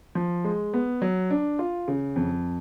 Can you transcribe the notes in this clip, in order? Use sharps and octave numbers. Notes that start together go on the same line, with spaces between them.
F3
G#3
B3
F#3
D4
F4
C#3
F2